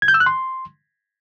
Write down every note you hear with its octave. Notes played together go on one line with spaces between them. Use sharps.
G#6
G6
E6
F#6
C6